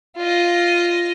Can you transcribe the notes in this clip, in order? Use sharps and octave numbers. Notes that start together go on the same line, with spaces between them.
F4 D#5